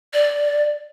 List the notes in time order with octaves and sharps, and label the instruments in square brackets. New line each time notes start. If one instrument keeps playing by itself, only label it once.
[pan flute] D5